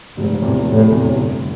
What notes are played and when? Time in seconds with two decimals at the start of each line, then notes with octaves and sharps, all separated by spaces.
0.17 F1 G#2
0.42 E2 A2 C3
0.67 F1 A2
0.91 E2 C3
1.16 G1